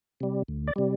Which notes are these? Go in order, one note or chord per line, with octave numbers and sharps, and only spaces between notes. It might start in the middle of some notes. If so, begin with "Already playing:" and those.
C3 G3
D2
D5
C3 G3